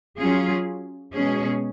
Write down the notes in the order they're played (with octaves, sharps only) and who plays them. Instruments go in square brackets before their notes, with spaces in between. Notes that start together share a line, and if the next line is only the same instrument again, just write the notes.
[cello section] F#3 C#4 F4 G#4
B2 G#3 C#4 G#4